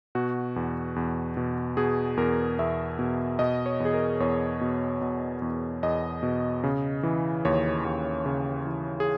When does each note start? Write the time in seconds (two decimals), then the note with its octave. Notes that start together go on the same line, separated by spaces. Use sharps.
0.15 B2 F#4
0.56 E2
0.96 E2
1.37 B2
1.77 B2 G#4
2.17 E2 A#4
2.59 E2 E5
2.99 B2
3.39 B2 D#5
3.66 C#5
3.80 E2
3.85 G#4
3.94 A#4
4.20 E2 C#5
4.61 B2
5.01 B2
5.42 E2
5.83 E2 D#5
6.23 B2
6.64 C#3
7.03 E3
7.45 D#2 C#5
7.85 D#2
8.26 C#3
8.66 E3
9.00 G#4